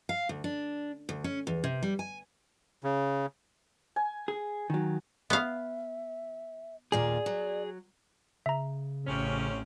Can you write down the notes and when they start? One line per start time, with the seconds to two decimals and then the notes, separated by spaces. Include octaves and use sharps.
0.09 F5
0.29 D2
0.44 D4
1.09 D2
1.24 C#4
1.47 E2
1.64 C3
1.83 G3
1.99 G#5
2.84 C#3
3.96 G#5
4.28 G#4
4.70 D#3 F#3
5.30 B3 E5 F5
6.92 D#2 A#2 F4 G#4 D5
7.26 F#3
8.46 C#3 E5 A#5
9.07 A1 F2 C3 C#4